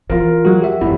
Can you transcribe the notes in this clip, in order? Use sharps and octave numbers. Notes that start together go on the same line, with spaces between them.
E3 F4 A#4
F#3 G#3 F#4
G4 E5 F#5
D#1 E2 G#3 E4